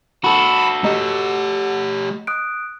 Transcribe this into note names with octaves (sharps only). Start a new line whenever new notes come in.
F#4 A4 B5
A3 G4 D#5 A#5
D#6 F#6 D7